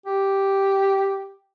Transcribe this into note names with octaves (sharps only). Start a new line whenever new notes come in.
G4